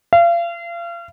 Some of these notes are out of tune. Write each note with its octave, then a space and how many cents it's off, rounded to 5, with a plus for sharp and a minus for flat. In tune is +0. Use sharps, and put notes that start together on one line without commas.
F5 -35